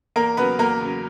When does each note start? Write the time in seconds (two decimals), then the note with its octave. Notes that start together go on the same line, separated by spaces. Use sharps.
0.16 E2 A#3 A#4
0.37 C#3 F#3 B3 B4
0.59 E2 A#3 A#4
0.81 C#3 F#3